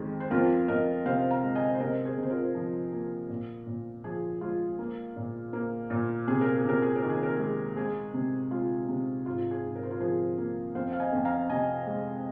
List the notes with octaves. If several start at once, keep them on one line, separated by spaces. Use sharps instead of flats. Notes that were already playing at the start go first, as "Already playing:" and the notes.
Already playing: F2 D#3 G#3
C5
F2 F4 A#4
F2 A#4 D#5
C3 C5 F5
F5 A#5
G#3
D#5 G#5
C5
C3 A#4 D#5
G#4 C5
C3
C5
F4 A#4
F3
A#3
A#2
A#2
F3 G#4
G#3 F4
A#3
A#2
A#3
A#2
C3 G#4
A#4
G#4
C3 A#4
G#4
A#4
D#3
G#4
A#4
G#3 G#4
G#3 G#4
C3
G#3 F4
C3
G#2 F4
G#4
G#2
A#4
C5
F4 A#4
F3 G#4 C5
A#3
F2 C5 F5
F5
D#5 G#5
F2
F5 A#5
C3 D#5 G#5
G#3